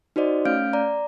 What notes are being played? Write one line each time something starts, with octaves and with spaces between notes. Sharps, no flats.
D#4 F#4 C5 D5 D#5
A3 C#4 F5 F6 G6 D7
D5 A#5